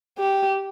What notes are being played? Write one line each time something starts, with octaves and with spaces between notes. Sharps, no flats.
G4